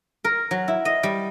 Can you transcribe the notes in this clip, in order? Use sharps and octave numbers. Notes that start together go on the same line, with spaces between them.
A#4
F#3
E4
D#5
G3